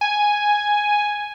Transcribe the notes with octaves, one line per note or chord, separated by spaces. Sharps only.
G#5